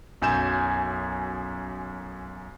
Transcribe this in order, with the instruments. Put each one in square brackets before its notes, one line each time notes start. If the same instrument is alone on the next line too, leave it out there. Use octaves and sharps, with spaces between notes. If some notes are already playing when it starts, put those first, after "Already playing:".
[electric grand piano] B1 F#2 G#5 G6 E7